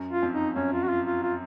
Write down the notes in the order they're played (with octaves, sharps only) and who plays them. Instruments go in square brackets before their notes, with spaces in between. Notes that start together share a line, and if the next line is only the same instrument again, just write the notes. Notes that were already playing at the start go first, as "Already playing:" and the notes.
Already playing: [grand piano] F#2
[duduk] F4
[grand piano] F2
[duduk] D#4
[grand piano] F#2 [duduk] C#4
[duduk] F4
F#4
F4
F4
F4